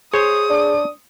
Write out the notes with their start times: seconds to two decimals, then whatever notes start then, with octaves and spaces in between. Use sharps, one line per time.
0.14 G#4 C5 C#5 D#6
0.50 D4